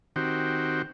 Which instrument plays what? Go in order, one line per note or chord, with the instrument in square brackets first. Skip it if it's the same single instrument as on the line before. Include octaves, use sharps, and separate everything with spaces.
[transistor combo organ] D#3 C4 F#4 G4